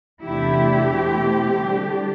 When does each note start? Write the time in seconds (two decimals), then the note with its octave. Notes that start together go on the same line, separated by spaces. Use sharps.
0.22 E2 C3 E3 A3 D4 E4 G4
0.92 B2 A3 C4 E4
1.62 D3 G3 D4